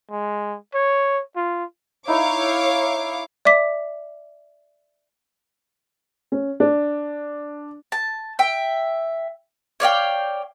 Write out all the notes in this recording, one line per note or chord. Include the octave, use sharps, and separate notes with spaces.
G#3
C#5
F4
D#4 E4 C#5 D#5 F5 D6
D5 E5 D6 B6
C#4
D4
A5
E5 G5
C#5 D5 F5 G5